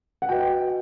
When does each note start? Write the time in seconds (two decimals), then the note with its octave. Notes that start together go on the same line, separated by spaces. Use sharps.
0.22 F#5
0.29 F#4 B4 D#5 G5